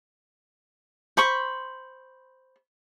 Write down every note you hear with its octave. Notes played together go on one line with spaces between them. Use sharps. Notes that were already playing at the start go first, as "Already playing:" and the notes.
C5 B5 C#6